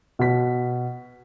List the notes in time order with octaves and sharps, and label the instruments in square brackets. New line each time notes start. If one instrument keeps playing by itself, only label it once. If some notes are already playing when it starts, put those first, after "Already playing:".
[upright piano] B2 B6